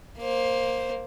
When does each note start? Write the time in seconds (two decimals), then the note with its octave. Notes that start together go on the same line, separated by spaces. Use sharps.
0.18 A#3 C5